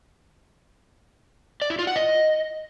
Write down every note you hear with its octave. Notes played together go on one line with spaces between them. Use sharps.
D5
E4
F4
F#5
D#5